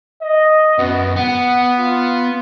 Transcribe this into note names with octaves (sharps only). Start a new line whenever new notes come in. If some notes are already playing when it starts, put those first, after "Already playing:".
D#5
F#2 B3
B3 F#5
F4